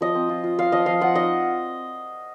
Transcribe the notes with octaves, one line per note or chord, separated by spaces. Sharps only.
F3 D#5
C4
F4
F4
F4 F5
F3 D#5
F3 F5
F4 F#5
D#4 D#5